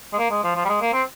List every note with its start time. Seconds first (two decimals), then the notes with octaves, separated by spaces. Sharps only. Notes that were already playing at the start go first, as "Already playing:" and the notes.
0.13 G#3
0.18 A#3
0.30 G#3
0.44 F3
0.56 F3
0.65 G3
0.69 G#3
0.81 A#3
0.93 C4